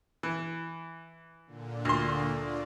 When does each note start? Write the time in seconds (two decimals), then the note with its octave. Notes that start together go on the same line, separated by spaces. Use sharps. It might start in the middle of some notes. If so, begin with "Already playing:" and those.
0.23 E3
1.47 A#2 D3
1.85 D2 C6
2.29 D4 F4 D5